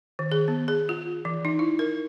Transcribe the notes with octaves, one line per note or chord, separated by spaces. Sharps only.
D#3
G#4
B3
G#4
F4
E3
D#4
E4
A#4